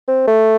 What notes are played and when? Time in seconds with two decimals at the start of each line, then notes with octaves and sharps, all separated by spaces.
0.08 C4
0.27 A3